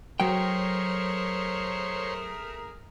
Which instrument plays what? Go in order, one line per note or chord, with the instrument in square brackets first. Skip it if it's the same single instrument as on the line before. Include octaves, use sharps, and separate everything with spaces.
[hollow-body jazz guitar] F#3 G5 [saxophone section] A3 G#4 A#4 [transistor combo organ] C5 C#5